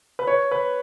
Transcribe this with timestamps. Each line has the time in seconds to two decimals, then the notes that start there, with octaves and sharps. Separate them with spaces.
0.19 B4
0.27 C#5
0.51 B4